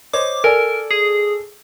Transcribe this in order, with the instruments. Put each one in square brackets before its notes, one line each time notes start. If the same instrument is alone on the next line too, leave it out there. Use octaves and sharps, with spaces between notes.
[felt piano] C5 C#5 D#5 [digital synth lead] D6
[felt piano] A4 D5 G#5 [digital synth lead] A#4
[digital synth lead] G#4